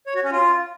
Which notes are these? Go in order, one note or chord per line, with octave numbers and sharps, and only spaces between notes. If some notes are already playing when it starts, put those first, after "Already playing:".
C#5
F#4
C#4
F4